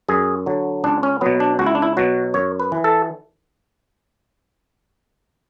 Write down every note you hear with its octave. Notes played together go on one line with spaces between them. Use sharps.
F#2 G#4
D3 F#3
C#2 D4
C#4
B2 F#3 B3
D4
C#2 F#4
E4
D4
E4
B2 F#3 F#4
F#2 C#5
B4
E3
A4